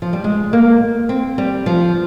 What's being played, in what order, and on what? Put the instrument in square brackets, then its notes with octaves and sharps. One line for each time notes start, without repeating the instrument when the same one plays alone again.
[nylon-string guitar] F3
G3
G#3
A#3
C4
G3
F3